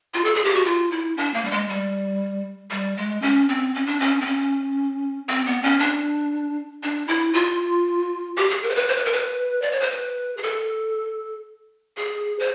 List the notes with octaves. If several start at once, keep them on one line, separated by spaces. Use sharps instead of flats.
F4
A4
G#4
G4
F#4
F4
E4
D4
A#3
G3
G#3
G3
G3
G#3
C#4
C4
C#4
D4
C#4
C4
C#4
C4
B3
C#4
D4
D4
E4
F4
G4
G#4
A#4
C5
B4
C5
B4
A#4
B4
D5
C#5
C5
B4
G#4
A4
G#4
C5